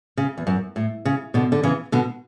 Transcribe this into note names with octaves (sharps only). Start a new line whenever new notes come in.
C#3
E2
F#2
A2
C#3
B2 D3
D3
C#3 E3
B2 D3